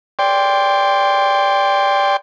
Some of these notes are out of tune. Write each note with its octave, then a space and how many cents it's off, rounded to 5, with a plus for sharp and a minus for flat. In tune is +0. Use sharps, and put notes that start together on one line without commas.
D5 -15 G5 +15 C6 +0